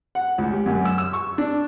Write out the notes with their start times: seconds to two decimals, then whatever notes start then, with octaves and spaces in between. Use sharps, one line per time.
0.15 F#5
0.38 C#2
0.52 G4
0.66 F#2
0.85 E6
0.98 E6
1.13 C#6
1.38 D4